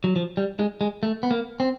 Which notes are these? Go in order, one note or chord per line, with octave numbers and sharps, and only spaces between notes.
F#3
F3
G3
G#3
G#3
A3
B3
A#3
C4